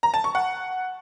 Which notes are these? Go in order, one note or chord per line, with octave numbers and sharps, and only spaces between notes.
A#5
A5
C#6
F#5